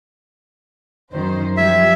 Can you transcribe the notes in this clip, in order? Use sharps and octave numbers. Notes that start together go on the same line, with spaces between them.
F#2 D#3 C5
F3 G3 E5 G#6